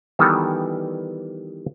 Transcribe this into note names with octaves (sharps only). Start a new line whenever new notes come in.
D#3 E3 G3 B3 F#4 A4